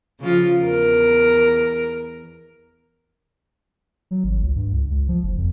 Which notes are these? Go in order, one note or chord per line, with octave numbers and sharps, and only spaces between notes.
C#3 F3 F4
E2 A#4
F#3
G#1
C#2
G2
C#2
C#2
F3
F#1
F2